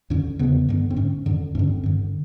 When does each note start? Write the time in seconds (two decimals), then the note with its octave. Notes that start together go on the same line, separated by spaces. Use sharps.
0.10 F2 D3 C#4
0.39 E2 C#3 B3
0.68 G2 D3 B3
0.90 C4
0.97 G#2 C#4
1.26 F2 D3
1.55 G2 D3 C#4
1.69 C4
1.84 G2 D3